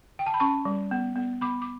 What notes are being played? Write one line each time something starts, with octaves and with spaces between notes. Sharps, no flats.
G5
A5
B5
C#4 A5 C#6
G3
B3
B3
B3 B5 D6
D6